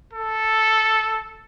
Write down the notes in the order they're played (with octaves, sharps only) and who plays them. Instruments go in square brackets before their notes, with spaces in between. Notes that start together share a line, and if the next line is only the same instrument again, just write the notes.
[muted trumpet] A4